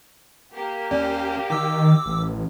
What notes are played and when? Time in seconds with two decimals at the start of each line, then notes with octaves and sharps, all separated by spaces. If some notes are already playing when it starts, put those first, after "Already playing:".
0.54 A#3 G4
0.91 D#2 C#4 D5
1.50 D#3 D6 E6
2.06 A1